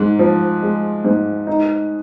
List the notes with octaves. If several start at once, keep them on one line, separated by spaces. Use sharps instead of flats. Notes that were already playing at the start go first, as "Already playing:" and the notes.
Already playing: G#2
F3
G#3
G#2
D#4